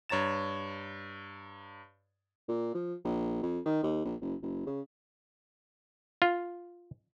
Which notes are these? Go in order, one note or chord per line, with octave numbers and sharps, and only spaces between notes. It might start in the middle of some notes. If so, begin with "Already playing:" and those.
G2 C#5 A#5 A6 E7
A#2
F3
A#1
F2
D#3
D#2
A#1
F#1
F#1
C#3
F4